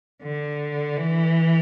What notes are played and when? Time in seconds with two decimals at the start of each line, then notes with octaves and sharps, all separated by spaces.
0.23 D3
0.97 E3